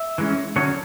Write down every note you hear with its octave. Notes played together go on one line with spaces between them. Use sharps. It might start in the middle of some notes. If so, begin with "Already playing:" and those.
Already playing: E5
E3 G#3 C#4
D3 F#3 C#4 C#5